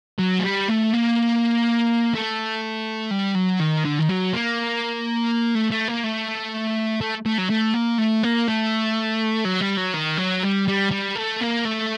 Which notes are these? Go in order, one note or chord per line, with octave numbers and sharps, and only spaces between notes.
F#3
A3
G3
A3
A#3
A3
G3
F#3
D#3
D3
D#3
F#3
A#3
A3
A3
A#3
A3
A3
A3
F#3
A3
A#3
A3
A#3
A3
F#3
G3
F#3
D#3
F#3
G3
G3
G3
A3
A#3
A3